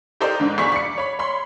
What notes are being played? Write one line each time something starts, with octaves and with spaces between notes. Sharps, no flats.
G4 A4 A#4 C5 D5 D#5
G#2 D3
B1 G#4 D5 B5 C#6 B6
D5 C#7
C#5 B5
C#5 B5 C6